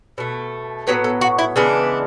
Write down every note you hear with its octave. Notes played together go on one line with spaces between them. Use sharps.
B2 A3
A2 F#3 B3 B4
A4
F#4
E4
C#3 E3 G#3 B3 D4